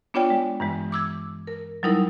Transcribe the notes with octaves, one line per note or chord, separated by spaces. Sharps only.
B3 D4 F4 C#5 D5 G5
G#3
G2 E3 G#3
E3 D6 E6 G#6
A#4
F#3 G3 D#4 E4 A#4